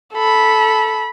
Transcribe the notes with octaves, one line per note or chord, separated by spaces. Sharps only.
A4 B5